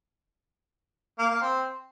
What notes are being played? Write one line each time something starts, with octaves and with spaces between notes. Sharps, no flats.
A#3
A#3
C4